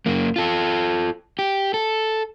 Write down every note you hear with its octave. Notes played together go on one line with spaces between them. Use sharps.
F#2 A#3
F4 A4
G4
A4